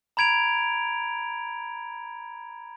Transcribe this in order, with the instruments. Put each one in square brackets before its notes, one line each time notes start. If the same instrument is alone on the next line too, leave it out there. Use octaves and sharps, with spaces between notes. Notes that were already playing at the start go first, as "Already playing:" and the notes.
[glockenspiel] A#5 B5 G#6 D7 F7